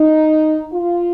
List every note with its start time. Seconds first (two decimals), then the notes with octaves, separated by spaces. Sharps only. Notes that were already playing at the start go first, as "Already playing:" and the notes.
Already playing: D#4
0.73 F4